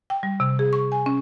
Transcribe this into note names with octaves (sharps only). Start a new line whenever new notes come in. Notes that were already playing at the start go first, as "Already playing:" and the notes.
G5
G3
C3
G#4
C#6
G#5
C#4